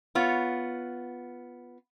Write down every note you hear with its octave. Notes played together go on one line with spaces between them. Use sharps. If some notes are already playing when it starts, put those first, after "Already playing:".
B3 F4 C#5